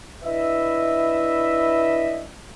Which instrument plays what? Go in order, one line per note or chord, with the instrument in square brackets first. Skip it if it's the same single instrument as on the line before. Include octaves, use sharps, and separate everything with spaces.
[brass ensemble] D4 E4 B4 D#5 E5